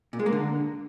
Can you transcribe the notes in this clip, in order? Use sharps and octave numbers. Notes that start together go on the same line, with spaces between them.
A#2
G#3
A#3
D3